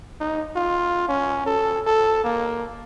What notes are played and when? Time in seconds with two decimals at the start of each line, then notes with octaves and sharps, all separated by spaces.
0.20 D#4
0.55 F4
1.08 C#4
1.46 A4
1.86 A4
2.24 A#3